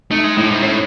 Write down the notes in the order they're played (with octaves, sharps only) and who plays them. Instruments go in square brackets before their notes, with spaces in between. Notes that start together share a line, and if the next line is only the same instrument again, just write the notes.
[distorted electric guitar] A3 [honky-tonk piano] D#4
[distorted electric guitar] G#3
[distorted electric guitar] A2 [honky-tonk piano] E4
[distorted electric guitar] G#2
[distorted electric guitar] A2 [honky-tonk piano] C#4